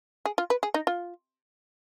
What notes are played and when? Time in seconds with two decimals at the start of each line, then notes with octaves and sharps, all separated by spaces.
0.25 G#4
0.38 F4
0.50 B4
0.63 G#4
0.74 D#4
0.87 F4